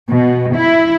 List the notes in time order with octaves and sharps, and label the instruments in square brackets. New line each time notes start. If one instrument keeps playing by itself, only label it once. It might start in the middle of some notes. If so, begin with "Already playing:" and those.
[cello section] B2
E4